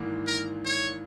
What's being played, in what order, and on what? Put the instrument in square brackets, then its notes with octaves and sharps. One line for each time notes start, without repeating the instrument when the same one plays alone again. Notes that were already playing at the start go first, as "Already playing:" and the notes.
Already playing: [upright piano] G#1 G#2 E3 A#3
[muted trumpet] A#4
C#5